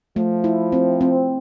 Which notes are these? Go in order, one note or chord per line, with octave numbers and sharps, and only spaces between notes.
F3 A3
E4
C4
C4